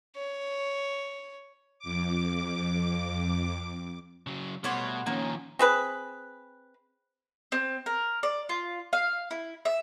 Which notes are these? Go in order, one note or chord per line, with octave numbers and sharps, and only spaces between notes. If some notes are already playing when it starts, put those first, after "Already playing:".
C#5
F2 D6
C#3 F#3
B2 G3 A3 C5 C#5 F#5
D#3 F3 A#3 C#4
C4 G#4 B4
C4
A#4
D5
F4
F5
E4
E5